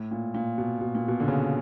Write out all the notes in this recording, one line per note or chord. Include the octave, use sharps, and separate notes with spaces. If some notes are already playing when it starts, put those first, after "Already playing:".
Already playing: A2
A#2
A#2
B2
B2
A#2
B2
D3
C#3